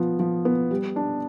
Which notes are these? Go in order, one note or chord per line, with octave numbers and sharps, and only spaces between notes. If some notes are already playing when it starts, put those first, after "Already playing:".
Already playing: F3 B3
F3
B3
G3
D4